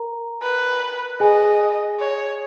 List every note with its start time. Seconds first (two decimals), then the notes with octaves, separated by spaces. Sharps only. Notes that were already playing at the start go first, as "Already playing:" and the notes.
Already playing: A#4 A#5
0.42 B4
1.20 G#4 D#5 G#5
2.00 C#5